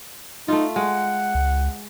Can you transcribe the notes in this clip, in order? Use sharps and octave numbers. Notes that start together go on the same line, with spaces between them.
A3 D#4 F4
G#3 F#5
C#2